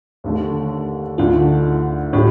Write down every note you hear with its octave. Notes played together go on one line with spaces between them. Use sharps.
D#2 D3 A3
D2 D3 A3 D4 D#4 F4
A2 G3 D4 F4